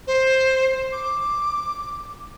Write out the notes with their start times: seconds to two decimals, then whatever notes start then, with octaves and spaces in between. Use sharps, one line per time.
0.07 C5
0.92 D6